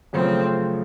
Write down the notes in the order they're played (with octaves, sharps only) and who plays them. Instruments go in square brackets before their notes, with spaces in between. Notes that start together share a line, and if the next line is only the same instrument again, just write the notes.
[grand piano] F#2 C#3 F3 A3 [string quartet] C4